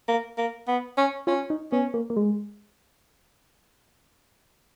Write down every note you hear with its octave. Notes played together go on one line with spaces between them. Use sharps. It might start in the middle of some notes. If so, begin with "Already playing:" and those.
A#3
A#3
B3
C#4
C#4 F4
D#4
B3 C#4
A#3
A#3
G#3